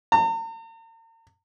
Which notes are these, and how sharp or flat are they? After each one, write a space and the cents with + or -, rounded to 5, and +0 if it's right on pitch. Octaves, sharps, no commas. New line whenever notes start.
A#5 -45